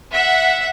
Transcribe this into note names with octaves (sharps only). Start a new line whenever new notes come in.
E5 F#5